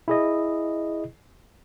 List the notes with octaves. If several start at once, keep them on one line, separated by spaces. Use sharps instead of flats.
E4 G#4 D#5